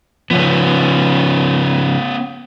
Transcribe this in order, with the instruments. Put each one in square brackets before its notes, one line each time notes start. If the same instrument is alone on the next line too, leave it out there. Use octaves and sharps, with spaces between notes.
[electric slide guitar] C#3 F3 [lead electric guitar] B3 C#4